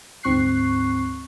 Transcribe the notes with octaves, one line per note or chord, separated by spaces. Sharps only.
D2 G#2 C4 C#6 F#6 C7